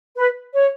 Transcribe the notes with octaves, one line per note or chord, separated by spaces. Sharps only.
B4
C#5